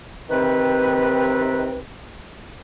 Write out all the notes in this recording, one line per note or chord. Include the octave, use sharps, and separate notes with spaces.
C3 D#3 C4 B4